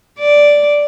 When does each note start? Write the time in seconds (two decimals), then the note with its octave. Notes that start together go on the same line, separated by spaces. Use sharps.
0.19 D5